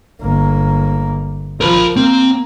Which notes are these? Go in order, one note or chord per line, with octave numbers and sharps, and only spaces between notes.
G1 A#3
F3 A#4 B5
A#3 C4